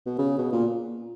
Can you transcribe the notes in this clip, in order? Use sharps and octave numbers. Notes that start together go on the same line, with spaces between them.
B2
C#3
B2
A#2